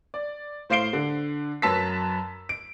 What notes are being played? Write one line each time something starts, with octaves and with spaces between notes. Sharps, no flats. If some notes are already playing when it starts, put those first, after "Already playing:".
D5
A2 C5 F5 C7 D7 G7
D3
F#2 F#3 B4 A5 E6 B6
D7